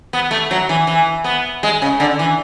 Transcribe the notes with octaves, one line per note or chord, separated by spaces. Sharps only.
B3
A3
F#3
E3
E3
B3
G#3
C#3
D3
E3